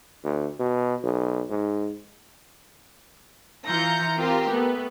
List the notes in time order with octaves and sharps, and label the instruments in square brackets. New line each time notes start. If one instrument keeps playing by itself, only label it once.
[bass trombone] D2
B2
B1
G#2
[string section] E3 F4 A#5 G6 C#7
C4 F4 G4 A#4
A3 B3